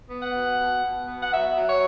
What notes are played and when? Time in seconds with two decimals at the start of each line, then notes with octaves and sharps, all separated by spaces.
0.10 B3
0.22 F#5
0.34 B2
0.58 B2
0.82 B2
1.07 B3
1.21 F#5
1.32 F#3 E5
1.56 F#3
1.68 C#5